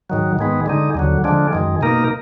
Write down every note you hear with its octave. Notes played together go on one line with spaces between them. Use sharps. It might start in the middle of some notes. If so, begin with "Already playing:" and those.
G#2 D#3 F#3
G#2 D#3 G#3 B3
D3 G#3 D#4
D#2 D3 F#3
D3 F3 G#3 D4
F#2 D#3 G#3
B2 A#3 D#4 A#4